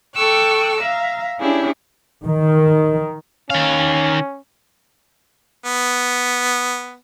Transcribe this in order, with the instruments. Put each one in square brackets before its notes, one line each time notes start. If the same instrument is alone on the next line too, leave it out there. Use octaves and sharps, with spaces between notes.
[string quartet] A4 G5 C#6 D6 E6 F#6
E5 F5 A#5
C#4 D4 E4 G4 G#4
[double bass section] D#3
[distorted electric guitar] D#3 F5 [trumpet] C#4
[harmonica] B3